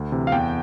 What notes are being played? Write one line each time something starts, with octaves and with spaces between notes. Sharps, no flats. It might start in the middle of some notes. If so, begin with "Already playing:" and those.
Already playing: D2
C3 E3
F5
E2 G5